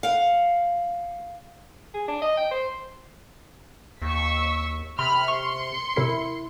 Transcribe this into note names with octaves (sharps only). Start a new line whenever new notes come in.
F5 F#5
G#4
D4
D#5
G5
C5
D#2 C#6 E6 B6
C3 B5 C6 F6
C6 C#6 C#7
C3 E4 A#4 C7